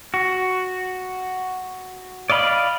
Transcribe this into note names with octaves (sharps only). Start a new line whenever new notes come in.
F#4
D5 D#5 F5 B5